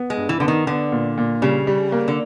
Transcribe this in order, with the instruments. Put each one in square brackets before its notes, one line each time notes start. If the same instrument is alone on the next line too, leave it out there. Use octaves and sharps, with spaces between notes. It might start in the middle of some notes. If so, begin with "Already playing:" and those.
Already playing: [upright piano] B3
[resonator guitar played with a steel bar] G#3
[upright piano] G2
[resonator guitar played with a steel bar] E3
[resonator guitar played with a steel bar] D3 [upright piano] B3
[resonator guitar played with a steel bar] D#3
[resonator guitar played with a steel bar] D3 [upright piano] B3
[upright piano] A#2
A#2
[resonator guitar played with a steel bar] C#3 [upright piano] G3
[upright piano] G3
A#3
[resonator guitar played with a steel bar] D3